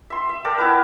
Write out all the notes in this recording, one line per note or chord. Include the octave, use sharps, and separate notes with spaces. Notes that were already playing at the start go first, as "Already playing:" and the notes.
E5 C6
E5
A4 A#4 D5 G5
B3 E4 A#4 B4